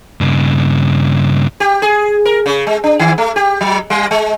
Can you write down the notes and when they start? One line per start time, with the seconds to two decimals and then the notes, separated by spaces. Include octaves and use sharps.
0.21 G2 C#3
1.60 G4
1.82 G#4
2.25 A#4
2.46 C#3
2.67 G#3
2.84 D4
2.99 D#3
3.18 A3
3.36 G4
3.61 F#3
3.90 G3
4.11 G#3